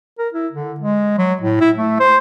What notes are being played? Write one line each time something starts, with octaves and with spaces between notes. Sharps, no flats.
A#4
E4
D3
G#3
F#3
A2
E4
A3
C5